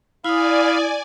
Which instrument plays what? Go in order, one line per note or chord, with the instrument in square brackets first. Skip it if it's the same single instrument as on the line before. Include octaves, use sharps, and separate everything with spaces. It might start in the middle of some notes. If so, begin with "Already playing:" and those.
[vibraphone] E4 D#6 [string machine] D5 G#5 [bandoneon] F5 B5